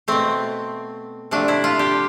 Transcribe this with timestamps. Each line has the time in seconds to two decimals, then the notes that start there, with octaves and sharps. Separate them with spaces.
0.08 B2 A3 C4
1.31 C3 F3 A3 D4
1.48 E4
1.64 F4
1.79 G4